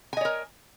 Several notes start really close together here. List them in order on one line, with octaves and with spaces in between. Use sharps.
G#5 D#5 C#5 A#4